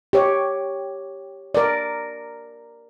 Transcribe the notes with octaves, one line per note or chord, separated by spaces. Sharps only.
G4 C#5
A#4 D5